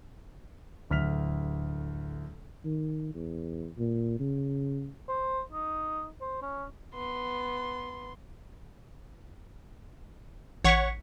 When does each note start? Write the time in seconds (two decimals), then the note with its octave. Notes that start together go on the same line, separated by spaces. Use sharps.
0.90 D1 D2 F6 B6 F7
2.65 D#3
3.15 E2
3.78 A#2
4.19 C#3
5.09 C5
5.52 D#4
6.21 C5
6.42 C#4
6.94 B3 C6
10.64 A1 C#5 F#5 C#6 B6 C#7